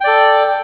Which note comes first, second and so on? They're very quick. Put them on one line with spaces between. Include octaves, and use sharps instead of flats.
G5 D5 A4